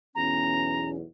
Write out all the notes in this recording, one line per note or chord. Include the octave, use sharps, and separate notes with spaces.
B1 E2 C#4 A#5